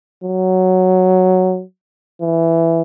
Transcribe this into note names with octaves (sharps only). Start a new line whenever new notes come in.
F#3
E3